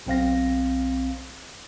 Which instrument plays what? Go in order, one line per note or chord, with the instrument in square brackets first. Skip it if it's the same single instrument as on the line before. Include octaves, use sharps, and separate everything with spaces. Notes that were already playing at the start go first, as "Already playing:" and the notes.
[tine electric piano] B1 C4 F5 A#6